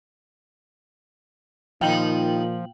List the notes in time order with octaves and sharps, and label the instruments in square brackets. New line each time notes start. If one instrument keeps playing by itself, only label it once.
[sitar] D#2 D#4 [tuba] A#2 [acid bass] F3 [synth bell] F5 G5 F#7